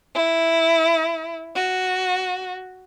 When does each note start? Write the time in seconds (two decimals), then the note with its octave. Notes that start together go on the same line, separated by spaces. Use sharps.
0.15 E4
1.56 F#4